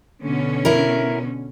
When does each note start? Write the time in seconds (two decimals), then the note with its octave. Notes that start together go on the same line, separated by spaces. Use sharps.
0.22 B2 D3 C#4
0.65 E4 A#4